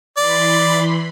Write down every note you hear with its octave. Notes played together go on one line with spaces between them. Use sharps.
E3 D5 B5 C6